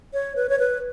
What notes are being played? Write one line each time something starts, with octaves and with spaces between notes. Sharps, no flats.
C#5
B4
C#5
B4